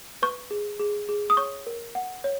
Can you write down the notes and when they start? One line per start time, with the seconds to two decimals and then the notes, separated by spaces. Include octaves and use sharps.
0.22 B4 C#6
0.51 G#4
0.79 G#4
1.09 G#4
1.30 D#6
1.37 C#5 C#6
1.66 A#4
1.95 F#5
2.24 C#5